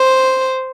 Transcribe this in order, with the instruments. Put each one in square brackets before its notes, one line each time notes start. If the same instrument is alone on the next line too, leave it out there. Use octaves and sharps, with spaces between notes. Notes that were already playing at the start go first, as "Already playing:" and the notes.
Already playing: [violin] C5